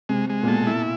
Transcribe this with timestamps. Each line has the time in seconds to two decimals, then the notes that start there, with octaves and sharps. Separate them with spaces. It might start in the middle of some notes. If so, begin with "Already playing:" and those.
0.09 C3 G#3
0.29 G#3
0.43 A#2
0.47 B2 A4
0.67 E4